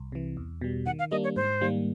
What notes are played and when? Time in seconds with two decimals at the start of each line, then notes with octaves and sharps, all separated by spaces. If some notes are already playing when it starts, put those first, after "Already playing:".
Already playing: C2
0.12 C3 E3
0.37 E2
0.61 B2 G3
0.86 D#3 F#5
0.99 F5
1.11 G3 A#3 D4 D#5
1.24 C#5
1.36 G#2 C5
1.61 D#3 G3 A#3